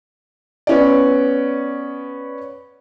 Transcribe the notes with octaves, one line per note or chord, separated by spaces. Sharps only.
B3 C#4 D5